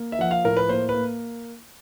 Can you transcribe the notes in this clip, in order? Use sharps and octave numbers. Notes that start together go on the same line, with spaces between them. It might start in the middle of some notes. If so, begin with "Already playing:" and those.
Already playing: A#3
E5
F3 F#5
F5
A2 A#4
B4
A#3 C5
B4
A#3